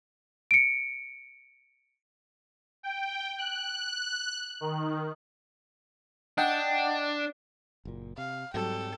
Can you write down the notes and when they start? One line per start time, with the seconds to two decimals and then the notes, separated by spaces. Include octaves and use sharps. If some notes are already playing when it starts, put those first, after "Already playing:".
0.51 C#7 D7
2.83 G5
3.38 F#6
4.61 D#3
6.38 D4 D#5 F#5 G5
7.85 F#1 A#2
8.18 C3 F5
8.54 G#2 F#3 G3 C4 A4 G5